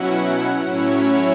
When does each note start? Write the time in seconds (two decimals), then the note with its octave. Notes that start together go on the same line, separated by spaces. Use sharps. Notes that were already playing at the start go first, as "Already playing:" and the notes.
Already playing: B2 F#3 C#4 E4 F#5
0.61 A2 F#3 C#4 E4 C#5